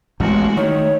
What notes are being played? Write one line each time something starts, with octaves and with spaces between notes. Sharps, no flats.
A1 E2 G#3 F#4 A#4
D#3 A3 C#5